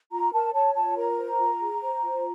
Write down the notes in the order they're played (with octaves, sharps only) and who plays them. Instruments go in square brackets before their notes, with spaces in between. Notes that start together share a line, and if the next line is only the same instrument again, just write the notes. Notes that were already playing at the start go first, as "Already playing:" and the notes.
[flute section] F4 A#5
A#4 A5
C#5 A5
F4 A5
A#4 A#5
C5
F4
G#4
C5
F4